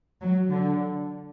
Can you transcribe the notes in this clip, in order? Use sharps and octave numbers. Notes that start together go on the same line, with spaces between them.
F#3
D3